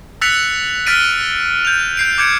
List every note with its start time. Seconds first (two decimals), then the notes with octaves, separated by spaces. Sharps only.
0.21 E6 F#6 A6 B6 C#7 F7
0.86 F6 F#6 A6 B6 D7 D#7
1.65 G6 F7
1.97 G6 C7 D7
2.18 D6 G6 G#6 C#7 D7